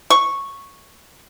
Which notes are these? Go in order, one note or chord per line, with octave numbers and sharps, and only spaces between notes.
C#6